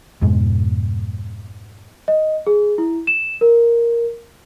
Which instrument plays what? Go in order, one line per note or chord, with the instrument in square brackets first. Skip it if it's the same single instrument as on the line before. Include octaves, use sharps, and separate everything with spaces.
[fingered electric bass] F2 G#2 B2 G#3
[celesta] D#5
G#4
E4
E7
A#4